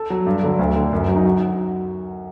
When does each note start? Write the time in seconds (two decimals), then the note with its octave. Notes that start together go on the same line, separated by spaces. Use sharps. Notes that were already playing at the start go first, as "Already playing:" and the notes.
Already playing: A4
0.10 F#3
0.27 G2
0.43 D3 F#3
0.59 D2 F#4
0.76 D3 F#3
0.93 F#2
1.09 F#3
1.16 D#4
1.26 F#4